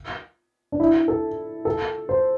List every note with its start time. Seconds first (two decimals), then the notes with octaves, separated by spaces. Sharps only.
0.72 D4
0.80 E4
1.08 A4
1.65 A4
2.09 C5